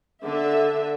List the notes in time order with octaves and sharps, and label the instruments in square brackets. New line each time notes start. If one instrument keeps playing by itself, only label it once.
[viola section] D3 E5